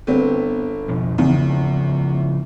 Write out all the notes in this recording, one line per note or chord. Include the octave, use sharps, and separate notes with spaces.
G1 B3 C4
F2 B2 F3
E2 C#3 F3